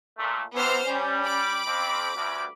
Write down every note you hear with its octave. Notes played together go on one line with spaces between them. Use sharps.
A#2 A3
C3 E3 B3 C5 F6
G3 C#4
B5 D6
F2 C4
D2 G2